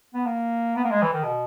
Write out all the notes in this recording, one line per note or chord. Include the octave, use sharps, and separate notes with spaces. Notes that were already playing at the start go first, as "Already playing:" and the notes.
B3
A#3
B3
A#3
G#3
E3
D#3
B2